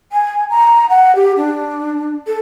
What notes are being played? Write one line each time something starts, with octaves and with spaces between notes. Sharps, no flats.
G#5
A#5
F#5
G4
D4
A4